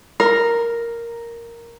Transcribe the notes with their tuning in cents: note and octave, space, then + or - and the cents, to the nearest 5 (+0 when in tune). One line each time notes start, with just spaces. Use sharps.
A#4 +0